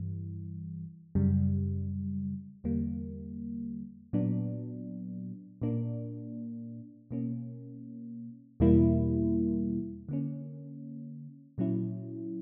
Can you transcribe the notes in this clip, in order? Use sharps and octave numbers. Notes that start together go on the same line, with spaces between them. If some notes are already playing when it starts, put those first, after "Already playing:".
Already playing: G2 E3 G3
F#2 C#3 G3
E2 D3 G3 A#3
A#2 F#3 B3 D4
A#2 A#3 D4
B2 A#3 C#4
E2 B2 G3 A#3 E4
D3 A#3 C#4
A#2 F#3 C#4 E4